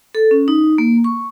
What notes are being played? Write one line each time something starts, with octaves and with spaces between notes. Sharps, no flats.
A4
C#4
D#4
A#3
C#6